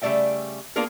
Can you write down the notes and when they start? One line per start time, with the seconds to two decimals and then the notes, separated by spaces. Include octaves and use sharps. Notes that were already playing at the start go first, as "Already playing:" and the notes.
0.02 C#3 G3 A3 D5 E5 G5
0.76 A#3 B3 D4 F4 G#4 A#4